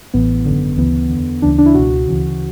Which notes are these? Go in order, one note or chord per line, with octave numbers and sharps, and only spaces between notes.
A1 A2 E3 B3
G#1 F#2 D3
D2 C#3 E3 B3
E2 D3
D2 C#3 E3 D4
D4
E4
C#2 B2 F#4
D2 C#3 E3